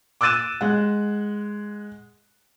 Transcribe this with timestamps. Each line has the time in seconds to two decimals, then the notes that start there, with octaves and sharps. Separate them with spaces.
0.21 D6 E6 F#6 A6 D#7 E7
0.61 G#3 F#5